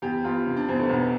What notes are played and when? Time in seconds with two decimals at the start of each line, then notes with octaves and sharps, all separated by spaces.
0.02 E2 G4
0.24 E2 F4
0.46 C3
0.57 D4
0.69 E2 C4
0.79 A3
0.89 B1 B3